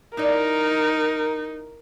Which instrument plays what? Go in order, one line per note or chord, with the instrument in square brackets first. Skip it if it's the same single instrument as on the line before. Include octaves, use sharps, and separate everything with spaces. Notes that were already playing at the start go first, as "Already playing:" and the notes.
[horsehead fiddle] D#4 [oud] E4 D5 [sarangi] A#4